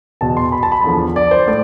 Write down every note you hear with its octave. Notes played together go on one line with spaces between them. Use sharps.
E2 B2 A5
C6
B5
A5
B5
E2 D3 F3
D5
C5
A2 D5